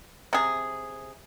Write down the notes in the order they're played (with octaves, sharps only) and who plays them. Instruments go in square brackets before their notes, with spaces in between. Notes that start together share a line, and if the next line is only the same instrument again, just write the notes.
[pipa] C3 G#4